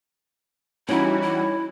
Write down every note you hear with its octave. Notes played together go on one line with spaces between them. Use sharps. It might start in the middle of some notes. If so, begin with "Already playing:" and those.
E3 G3 C#4 D#4 E4 F#4
E4